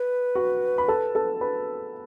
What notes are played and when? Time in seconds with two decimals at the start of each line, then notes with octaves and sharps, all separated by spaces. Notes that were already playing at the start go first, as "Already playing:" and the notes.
Already playing: B4
0.35 F#4 F#5
0.78 B5
0.88 A4 A5
1.15 A4 A5
1.41 B4 B5